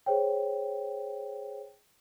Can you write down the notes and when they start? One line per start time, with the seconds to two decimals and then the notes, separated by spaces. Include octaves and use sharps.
0.06 G#4 C5 C#5 G5